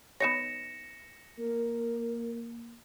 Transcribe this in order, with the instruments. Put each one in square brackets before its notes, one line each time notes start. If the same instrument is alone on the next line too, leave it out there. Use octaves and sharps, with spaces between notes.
[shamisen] B3 D#4 C#5 [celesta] A#6 C#7 E7
[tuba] A#3 [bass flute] A#4